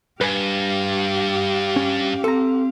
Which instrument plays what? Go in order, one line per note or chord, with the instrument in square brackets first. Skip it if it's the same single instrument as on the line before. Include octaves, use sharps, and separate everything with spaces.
[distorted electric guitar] G2 [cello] G4 F5 [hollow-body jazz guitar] B4 G#5
[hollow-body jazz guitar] C#4
[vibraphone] C4 [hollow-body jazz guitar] A4 A#5